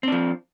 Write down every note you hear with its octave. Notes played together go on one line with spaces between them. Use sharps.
F3 C4 D4